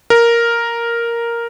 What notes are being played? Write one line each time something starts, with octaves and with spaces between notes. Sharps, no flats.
A#4